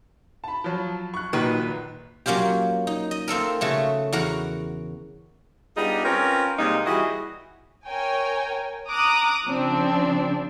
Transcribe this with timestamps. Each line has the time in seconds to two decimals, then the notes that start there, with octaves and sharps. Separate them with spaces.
0.44 A5 B5
0.64 F3 F#3
1.14 C#6 F#6
1.33 A#1 A#2 D#3 F#3 B4
2.26 F#3 A#3 C#4 F4 G4
2.87 D#4
3.11 D#5
3.28 A#3 C4 A4 A#4
3.61 C#3 A3 F#4
4.13 E2 F#4 A#4 F#5
5.77 G3 B3 D4 D#4 F4 G#4
6.05 C4 C#4 F4 A#4 B4 C#5
6.58 C3 D#3 G3 G#3 A#3 D#4
6.86 E3 G3 E4 F#4 G#4 D#5
7.88 A#4 C#5 G5 G#5
8.90 A#5 D6 D#6 F#6
9.46 C#3 F3 C4 D4